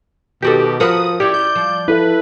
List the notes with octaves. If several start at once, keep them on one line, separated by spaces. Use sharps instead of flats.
B2 D#3 F#4 G4 A4
F3 F#4 A#4 B4 D#6
C#4 E4 G4 D5
G6
F3
E4 A4 B4 E5